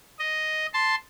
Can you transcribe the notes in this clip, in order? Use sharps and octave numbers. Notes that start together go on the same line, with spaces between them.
D#5
A5 C6